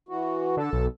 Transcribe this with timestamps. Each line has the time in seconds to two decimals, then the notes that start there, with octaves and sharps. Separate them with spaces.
0.09 E3 F#4
0.57 D3 A4
0.73 B1